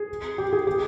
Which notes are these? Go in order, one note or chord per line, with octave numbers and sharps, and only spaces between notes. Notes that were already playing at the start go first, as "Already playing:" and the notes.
Already playing: G#4
G4
G#4
G4